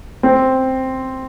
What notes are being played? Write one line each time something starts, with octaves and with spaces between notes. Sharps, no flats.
C4